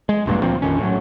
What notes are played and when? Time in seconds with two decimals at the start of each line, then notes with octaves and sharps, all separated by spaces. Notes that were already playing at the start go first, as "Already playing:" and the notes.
0.09 G#3
0.26 E1 A#1 G2 A#3
0.43 D2 A#2 F3 C4
0.62 A#1 F2 D#3 C#4
0.79 A2 F#3